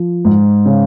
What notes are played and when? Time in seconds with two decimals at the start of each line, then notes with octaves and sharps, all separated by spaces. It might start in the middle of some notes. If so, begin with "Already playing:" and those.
Already playing: F3
0.25 G#2
0.66 C#3